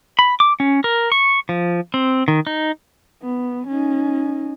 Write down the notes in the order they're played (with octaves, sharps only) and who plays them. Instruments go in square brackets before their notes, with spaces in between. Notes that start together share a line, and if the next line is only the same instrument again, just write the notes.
[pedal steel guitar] B5
D6
C#4
A#4
C#6
F3
C4
D#3
D#4
[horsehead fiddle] B3
C#4 D#4